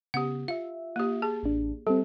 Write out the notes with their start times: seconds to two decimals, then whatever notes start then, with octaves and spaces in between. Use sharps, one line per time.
0.14 C#3 B3 G4 F#5
0.48 F4 E5 F5
0.96 A#3 G4
1.22 G#4 A5
1.43 A1 D4
1.87 G3 C4 G4 A4